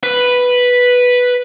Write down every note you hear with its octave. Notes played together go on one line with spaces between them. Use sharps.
B4